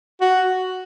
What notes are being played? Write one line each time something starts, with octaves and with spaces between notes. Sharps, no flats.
F#4